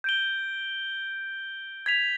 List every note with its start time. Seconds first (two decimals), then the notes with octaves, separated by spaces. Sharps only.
0.04 G6 D7 G7
1.86 G#6 B6 F7